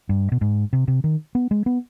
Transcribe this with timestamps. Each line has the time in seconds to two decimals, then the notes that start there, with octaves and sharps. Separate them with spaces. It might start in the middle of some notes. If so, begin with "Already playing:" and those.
0.09 G2
0.32 B2
0.41 G#2
0.73 C3
0.88 C3
1.04 D#3
1.35 B3
1.51 G#3
1.66 B3